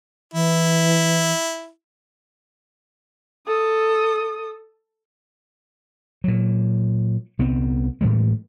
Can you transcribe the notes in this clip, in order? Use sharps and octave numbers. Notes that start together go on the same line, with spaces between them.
E3 E4
A4 D#6
A#2 F#3
C2 B3 C4
A2 E3 G3 G#3